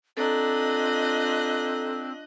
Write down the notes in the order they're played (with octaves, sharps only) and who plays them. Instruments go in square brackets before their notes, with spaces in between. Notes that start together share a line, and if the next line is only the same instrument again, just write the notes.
[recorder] C4 [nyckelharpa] D4 F4 [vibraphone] A4 A#5 [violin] D#5 F#6